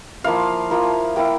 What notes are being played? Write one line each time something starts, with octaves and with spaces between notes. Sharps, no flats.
F3 A#3 E4 F5
F3 A#3 E4
A#3 E4 G5